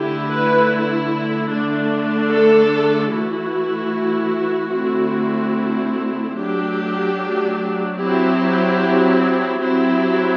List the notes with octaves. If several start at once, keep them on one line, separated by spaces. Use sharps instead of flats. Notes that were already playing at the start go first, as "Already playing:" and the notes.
Already playing: D3 A3 E4 G4
B4
D3 A3 D4
A4
E3 A3 E4 F#4
D3 A3 C4 E4
F#3 A3 D4 G4
F#3 C4 E4 G4
F#3 C4 E4 G4